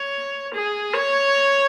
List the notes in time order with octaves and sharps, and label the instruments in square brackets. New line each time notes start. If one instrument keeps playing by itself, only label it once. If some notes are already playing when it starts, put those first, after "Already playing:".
Already playing: [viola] C#5
G#4
C#5